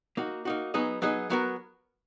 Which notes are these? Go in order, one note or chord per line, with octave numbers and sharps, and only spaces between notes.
A#3 D#4 F#4
A#3 D#4 F#4
F#3 B3 D#4 G#4 D#5
F#3 B3 D#4 G#4 D#5
F#3 B3 F#4 A#4